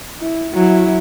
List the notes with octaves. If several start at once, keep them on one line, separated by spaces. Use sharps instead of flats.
E4
F#3 E4